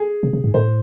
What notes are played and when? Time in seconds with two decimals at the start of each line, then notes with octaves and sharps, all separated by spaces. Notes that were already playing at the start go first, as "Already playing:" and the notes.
Already playing: G#4
0.23 C3
0.33 C3
0.44 G#2
0.54 A2 C5